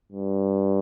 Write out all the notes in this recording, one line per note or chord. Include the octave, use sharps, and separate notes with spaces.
G2